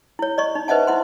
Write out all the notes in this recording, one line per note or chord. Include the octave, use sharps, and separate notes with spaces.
E4 C#5
D5 D#5 C#6
D#4
B4 C5 D#5 E5 F#5 A5
E4 F#5 C6